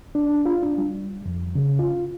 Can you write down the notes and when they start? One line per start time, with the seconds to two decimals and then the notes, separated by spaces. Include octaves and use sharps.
0.15 D4
0.46 F4
0.63 D4
0.78 G3
1.26 F2
1.55 C#3
1.79 F4